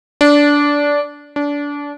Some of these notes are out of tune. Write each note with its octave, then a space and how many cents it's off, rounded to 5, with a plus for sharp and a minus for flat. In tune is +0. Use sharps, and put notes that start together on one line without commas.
D4 -15
D4 -25